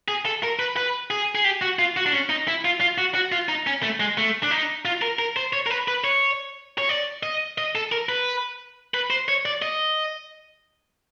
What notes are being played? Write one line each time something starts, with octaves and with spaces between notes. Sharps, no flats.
G#4
A4
A#4
B4
B4
G#4
G#4
G4
F#4
F4
F#4
D4
C#4
D#4
E4
F4
F4
F#4
F#4
F4
D#4
C#4
A3
G#3
A3
D4
D#4
F4
A#4
A#4
C5
C#5
A#4
B4
B4
C#5
C#5
D5
D#5
D#5
A4
A#4
B4
B4
C5
C#5
D5
D#5